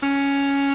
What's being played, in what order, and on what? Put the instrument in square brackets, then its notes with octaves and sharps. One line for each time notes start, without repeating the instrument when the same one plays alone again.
[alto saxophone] C#4